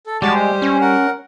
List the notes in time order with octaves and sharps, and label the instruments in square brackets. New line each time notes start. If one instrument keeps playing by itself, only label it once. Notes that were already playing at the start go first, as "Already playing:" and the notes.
[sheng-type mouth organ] A4
[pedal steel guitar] G3 G4 [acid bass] G#3 [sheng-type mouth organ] F#4 D5 A5
[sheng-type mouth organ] C5
[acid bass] C#4
[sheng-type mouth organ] A#4 F#5